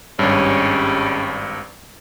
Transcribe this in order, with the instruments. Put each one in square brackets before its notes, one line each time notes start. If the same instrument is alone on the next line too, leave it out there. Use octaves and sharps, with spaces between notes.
[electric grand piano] G#1 G2 [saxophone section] G3 G#3 C#4